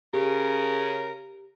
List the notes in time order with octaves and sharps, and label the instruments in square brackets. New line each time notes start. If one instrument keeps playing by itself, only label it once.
[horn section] C#3 [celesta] G4 [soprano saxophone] A#4